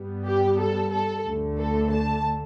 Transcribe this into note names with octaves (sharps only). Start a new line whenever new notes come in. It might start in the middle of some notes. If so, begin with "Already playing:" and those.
Already playing: G2 G3 B3
G4
A4
A4
D2 D3 A3
A4
A5